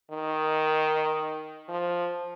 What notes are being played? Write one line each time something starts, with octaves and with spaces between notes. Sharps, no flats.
D#3
F3